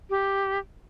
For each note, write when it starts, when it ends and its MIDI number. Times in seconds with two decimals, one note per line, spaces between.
0.10 0.58 67